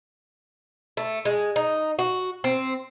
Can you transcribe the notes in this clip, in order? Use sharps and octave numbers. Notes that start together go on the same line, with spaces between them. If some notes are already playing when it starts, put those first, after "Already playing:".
A3
G#3
D#4
F#4
C4